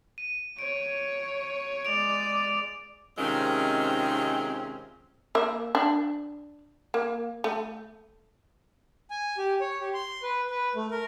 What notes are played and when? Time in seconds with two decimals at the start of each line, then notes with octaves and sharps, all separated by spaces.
0.18 D#7
0.59 C#5 D7
1.85 G#3 D5 D7 F7
3.18 C3 D#3 G#3 C4 C#4 F4
5.35 A#3 E5
5.75 D4
6.94 A#3
7.44 A3
9.10 G#5
9.38 G4
9.61 C#5
9.80 G4
9.93 C6
10.23 B4
10.50 B4
10.75 A3
10.91 A#4